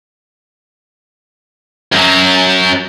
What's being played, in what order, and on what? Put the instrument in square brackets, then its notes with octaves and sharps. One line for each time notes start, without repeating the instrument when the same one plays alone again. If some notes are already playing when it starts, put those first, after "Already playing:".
[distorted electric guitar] F#2 F#3